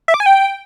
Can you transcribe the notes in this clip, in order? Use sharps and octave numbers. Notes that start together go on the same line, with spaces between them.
E5
D6
G#5
G5